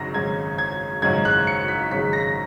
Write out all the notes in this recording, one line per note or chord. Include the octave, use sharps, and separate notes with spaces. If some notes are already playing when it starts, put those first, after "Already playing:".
Already playing: G#1 F#2 C#3 G#3 A#6
G#1 F#2 C#3 G#3 G#6
G#6
G#1 F#2 C#3 G#3 G#6
F#6
C#7
B6
G#1 F#2 C#3 G#3 B6
A#6